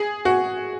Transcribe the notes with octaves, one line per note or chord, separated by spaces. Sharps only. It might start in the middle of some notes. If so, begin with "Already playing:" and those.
Already playing: G#4
F#4